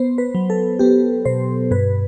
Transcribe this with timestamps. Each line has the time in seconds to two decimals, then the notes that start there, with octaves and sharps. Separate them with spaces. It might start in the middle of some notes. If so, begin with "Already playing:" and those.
Already playing: B3 C5
0.18 B4
0.35 F#3
0.50 A4
0.79 B3 G4
1.25 B2 C5
1.71 G2 B4